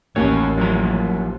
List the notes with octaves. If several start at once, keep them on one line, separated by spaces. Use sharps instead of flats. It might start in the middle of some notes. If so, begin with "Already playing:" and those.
A1 D#2 C#4 F#4 C#5
F3 F#3 E4 A#5